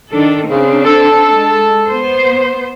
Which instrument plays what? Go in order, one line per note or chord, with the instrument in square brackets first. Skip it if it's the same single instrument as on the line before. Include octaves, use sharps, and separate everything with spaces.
[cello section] D#3 D4 A4
[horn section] C#3 [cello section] C4 D4
[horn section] A4
[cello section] G#3
B3 C5